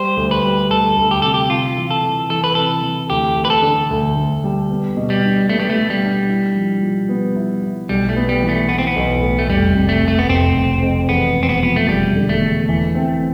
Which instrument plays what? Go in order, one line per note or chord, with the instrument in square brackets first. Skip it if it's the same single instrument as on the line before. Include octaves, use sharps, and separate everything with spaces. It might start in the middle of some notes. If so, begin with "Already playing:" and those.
Already playing: [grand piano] G3 [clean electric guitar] C5
[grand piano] D2
[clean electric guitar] B4
[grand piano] G3
[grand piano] D2 [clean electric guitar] A4
[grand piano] D2
[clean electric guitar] G4
[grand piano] C3 [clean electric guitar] A4
[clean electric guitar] G4
[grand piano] C3 [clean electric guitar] F4
[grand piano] E3
[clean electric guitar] A4
[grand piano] E3
[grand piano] E3 [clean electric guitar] A4
[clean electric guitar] B4
[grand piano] C3 [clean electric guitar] A4
[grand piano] E3
[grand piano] D2 [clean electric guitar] G4
[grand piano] D2
[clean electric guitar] B4
A4
[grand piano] D3
D2
D2
G3
B3
B2
[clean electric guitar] G3
[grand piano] D4
[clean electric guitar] A3 [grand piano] B3
[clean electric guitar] G3
A3
[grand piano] D4
[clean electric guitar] G3
[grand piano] D4
E4
F3
F3
B3
E4
E4
[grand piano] B1 [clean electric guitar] G3
[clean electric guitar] A3
[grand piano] B3
[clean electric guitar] G3
[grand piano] E3
[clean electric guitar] A3
[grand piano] E3 [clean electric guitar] B3
[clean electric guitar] C4
B3
[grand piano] B1
A2
[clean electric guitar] A3
[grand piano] F1 [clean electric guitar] G3
[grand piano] C3
[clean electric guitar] A3
[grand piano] F1
[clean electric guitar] A3
B3
[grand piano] F1 [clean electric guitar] C4
[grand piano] F1
F2
[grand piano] E2 [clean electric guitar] B3
[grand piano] E1
[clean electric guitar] C4
B3
[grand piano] F3 [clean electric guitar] B3
[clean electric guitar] A3
[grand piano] E1 [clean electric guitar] G3
[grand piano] D3
[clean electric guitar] A3
[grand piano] E2
E3
C4